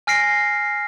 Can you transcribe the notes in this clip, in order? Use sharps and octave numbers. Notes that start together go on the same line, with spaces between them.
G#5 F6 A#6 C7 D7